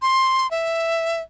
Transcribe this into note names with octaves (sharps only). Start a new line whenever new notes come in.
C6
E5